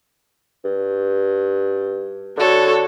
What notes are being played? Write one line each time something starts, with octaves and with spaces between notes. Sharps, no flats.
G2
D3 F#4 A4 C#5